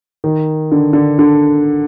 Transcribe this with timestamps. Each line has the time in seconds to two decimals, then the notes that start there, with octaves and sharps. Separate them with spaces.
0.24 D#3
0.72 D3
0.93 D3
1.19 D3